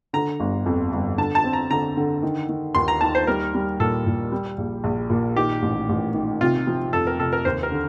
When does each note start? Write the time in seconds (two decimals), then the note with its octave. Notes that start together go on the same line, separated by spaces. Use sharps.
0.13 D3 A#5
0.40 G1
0.66 F2
0.92 G1
1.18 D3 A5
1.35 A5
1.44 C4
1.53 A#5
1.70 D3 A#5
1.97 D3
2.22 D#3
2.49 D#3
2.75 D#2 C6
2.88 A#5
3.01 D#3 A5
3.15 C5
3.27 G3 A#4
3.54 G3
3.80 A#2 A4
4.06 A#2
4.32 G3
4.58 A#1
4.84 A#1
5.10 A#2
5.36 D#3 G4
5.62 A1
5.89 A1
6.14 D#3
6.41 C3 F4
6.67 F3
6.93 F2 A4
7.07 A#4
7.19 C3 A4
7.33 A#4
7.45 D#2 C5
7.63 A#4
7.71 D3